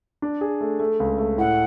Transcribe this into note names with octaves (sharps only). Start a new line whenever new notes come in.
D4
G#4
A3
A3
C#2
A3
A2 F#5